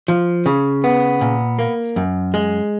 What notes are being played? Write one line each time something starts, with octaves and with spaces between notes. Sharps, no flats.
F3
C#3
B3
A#2
A#3
F#2
G#3